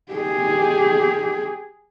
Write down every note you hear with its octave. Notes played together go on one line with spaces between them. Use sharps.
G4 G#4